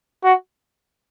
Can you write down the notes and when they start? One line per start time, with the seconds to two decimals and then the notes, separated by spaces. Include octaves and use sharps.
0.24 F#4